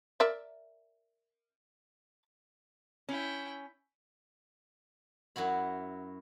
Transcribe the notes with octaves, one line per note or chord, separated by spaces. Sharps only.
A#4 D5 E5
C#4 E4 G5
F#2 E4 F#4 B5